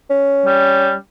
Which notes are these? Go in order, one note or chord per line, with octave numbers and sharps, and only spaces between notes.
C#4
G3